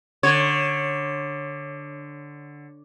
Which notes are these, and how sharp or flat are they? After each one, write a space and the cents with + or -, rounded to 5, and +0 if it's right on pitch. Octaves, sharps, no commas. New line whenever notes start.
D3 +0 C#5 -10